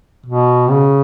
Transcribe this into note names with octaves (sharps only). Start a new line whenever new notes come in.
B2
C#3